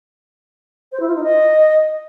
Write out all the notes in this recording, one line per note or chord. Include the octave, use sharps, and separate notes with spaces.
C5
E4
F4
D#4
D#5